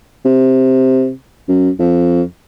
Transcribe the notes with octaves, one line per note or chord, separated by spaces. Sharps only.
C3
F#2
F2